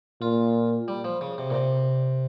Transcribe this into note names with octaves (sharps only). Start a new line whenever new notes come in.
A#2 F4
G3
F3
C#3
C3
A#2
C3